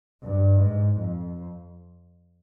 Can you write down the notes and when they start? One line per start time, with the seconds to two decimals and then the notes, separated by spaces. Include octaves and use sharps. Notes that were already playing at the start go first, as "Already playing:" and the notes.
0.22 G2
0.60 G#2
1.00 F2